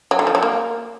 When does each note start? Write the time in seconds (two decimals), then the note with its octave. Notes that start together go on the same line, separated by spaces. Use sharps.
0.11 F#3
0.19 D3
0.27 F3
0.35 F#3
0.43 A#3